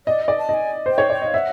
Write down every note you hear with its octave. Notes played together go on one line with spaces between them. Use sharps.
D5 D#5
D#5
D5
A5
D#5
G#5
C5
G5
C#5
D5 G5
D#5
F5
E5 F#5